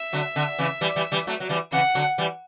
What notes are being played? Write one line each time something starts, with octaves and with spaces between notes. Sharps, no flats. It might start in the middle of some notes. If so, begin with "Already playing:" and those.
Already playing: E5
D3 F#3
D3
C#3 E3
E3 G3
E3 G3
E3 G3
F#3 A3
F#3
E3 G3
C#3 E3 F#5
D3 F#3
E3 G3